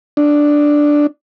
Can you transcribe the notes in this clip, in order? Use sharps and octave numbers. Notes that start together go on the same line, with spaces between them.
D4